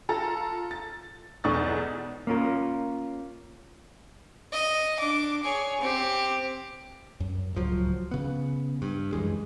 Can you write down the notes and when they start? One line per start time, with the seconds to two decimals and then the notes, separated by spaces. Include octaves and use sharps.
0.09 F4 A4 A#5 A6
0.71 A6
1.44 B1 E2 D5 C#6 D#6 A6
2.27 A#3 C#4 F4 A#4
4.53 D#5
4.98 D4 D6
5.43 G#4 C#5
5.80 C4 G4
7.20 F#2
7.55 D1 C#2 F3 F#3
8.11 C#3 B3
8.82 G2
9.13 F#2 E3 G#3